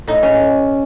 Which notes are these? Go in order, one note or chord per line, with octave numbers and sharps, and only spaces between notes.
A2 D#4
C#4